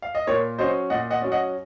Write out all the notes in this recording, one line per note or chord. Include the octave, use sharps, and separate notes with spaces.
F5
D#5
A#2 A#4 C#5
F#3 C#4 C5 D#5
A#2 D#5 F#5
D#5 F#5
F#3 C#4
D#5 F#5